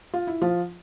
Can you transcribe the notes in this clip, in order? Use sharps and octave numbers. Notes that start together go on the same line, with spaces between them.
F4
E4
F3 F4